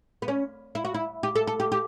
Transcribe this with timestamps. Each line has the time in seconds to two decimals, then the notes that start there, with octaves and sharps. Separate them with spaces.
0.22 B3
0.28 C#4
0.75 E4
0.85 F#4
0.94 E4
1.23 G4
1.36 A4
1.47 A4
1.60 G4
1.72 G4